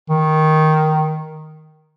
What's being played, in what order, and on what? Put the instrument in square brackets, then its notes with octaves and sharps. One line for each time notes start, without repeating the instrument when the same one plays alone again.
[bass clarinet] D#3